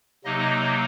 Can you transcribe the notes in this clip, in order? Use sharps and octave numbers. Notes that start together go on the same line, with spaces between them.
C3 F#3 A#3 D#4 D#5